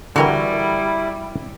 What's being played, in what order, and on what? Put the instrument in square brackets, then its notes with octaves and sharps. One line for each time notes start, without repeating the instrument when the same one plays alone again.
[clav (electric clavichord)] D3 E3 [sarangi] G3 [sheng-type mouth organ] E4 [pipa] F#4 A#4 G5